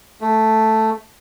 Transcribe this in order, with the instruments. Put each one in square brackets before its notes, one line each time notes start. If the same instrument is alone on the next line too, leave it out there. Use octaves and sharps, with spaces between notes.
[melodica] A3